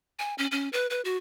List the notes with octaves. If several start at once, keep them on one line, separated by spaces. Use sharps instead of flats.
G#5
C#4
C#4
B4
B4
F#4